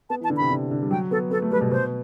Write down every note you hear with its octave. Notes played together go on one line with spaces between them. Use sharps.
B3 A5
E3
A5
D3
C3 B5
D3
D3
G3
F#3 G5
B3 A4
B3 A4
A3
G3 B4
B2
B2 C5